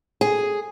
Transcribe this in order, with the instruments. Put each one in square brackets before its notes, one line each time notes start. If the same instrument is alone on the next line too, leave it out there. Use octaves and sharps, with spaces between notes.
[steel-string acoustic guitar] G#4